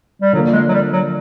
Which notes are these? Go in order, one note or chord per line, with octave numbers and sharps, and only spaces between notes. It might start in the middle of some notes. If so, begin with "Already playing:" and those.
G3
D3 F3 F#3 A#3
G#3
F#3
G3
F#3